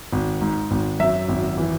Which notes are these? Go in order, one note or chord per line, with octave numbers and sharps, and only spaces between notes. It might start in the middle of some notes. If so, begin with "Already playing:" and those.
G#1
G#2
G#1
F#2 E5
G#1
E3